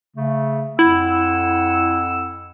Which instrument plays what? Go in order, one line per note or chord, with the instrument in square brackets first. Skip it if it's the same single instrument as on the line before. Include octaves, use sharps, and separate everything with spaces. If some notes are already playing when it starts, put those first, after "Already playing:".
[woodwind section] C#3 A3
[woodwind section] F2 F#5 E6 [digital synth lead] E4